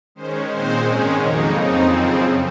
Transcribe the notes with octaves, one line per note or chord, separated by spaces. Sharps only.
D#3 G#3 C#4 C5
A#2 G#3 C4 D#4 C5
G#2 D#3 G#3 C#4
F2 C#3 F#3 A#3 D#4 A#4
F2 C#3 F3 C4 D#4
F#2 C#3 F3 C4 G#4